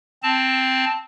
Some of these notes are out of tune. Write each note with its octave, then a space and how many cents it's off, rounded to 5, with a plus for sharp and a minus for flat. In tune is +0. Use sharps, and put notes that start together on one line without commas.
C4 +0 A5 +0